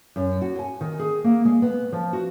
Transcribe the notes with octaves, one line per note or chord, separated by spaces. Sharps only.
F#2
F#4
G#5
D#3
G#4
A#3
G#3
B3
F3
F#4